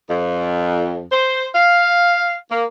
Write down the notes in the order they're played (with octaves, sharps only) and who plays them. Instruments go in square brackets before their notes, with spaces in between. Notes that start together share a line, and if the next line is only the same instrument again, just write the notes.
[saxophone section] F2
C5
F5
A#3